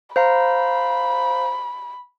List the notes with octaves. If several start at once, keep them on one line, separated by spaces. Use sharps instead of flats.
C5 F5 A#5 B5